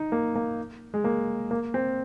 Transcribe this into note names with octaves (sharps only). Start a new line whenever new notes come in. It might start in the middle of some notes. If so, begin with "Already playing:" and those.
Already playing: D#4
A#3
A#3
G#3
A#3
A#3
C4